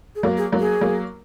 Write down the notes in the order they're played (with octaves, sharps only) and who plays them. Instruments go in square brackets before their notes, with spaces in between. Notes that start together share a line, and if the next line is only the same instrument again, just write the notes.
[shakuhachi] G#4
[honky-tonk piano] F#3 A#3
[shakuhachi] G#4
[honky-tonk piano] F#3 A#3
[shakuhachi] G#4
[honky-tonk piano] F#3 A#3